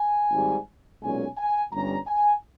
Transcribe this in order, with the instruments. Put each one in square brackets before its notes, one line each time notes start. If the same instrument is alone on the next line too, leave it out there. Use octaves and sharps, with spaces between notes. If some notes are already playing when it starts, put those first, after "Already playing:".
Already playing: [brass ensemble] G#5
G#1 G#2 G3
B1 A#2 G#3 C#4 G#5
G#5
G1 G2 G3 C#4 A#5
G#5